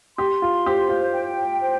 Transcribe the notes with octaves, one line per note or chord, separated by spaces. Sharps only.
G4 C6
F4
G4 C5
F4
G5
C5